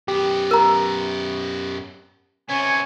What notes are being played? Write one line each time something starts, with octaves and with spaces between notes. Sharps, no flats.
F#2 B3 G4
A#4 A#5
C3 B3 C#4 C#5 G#5